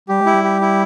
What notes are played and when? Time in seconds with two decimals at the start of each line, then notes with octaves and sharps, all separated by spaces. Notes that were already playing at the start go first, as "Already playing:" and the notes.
0.09 G3 G4
0.21 G#3 E4
0.34 G3
0.44 G4
0.61 E4